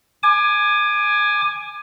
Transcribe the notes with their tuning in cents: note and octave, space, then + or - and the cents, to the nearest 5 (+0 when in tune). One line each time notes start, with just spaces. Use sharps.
G#5 +5 D6 +30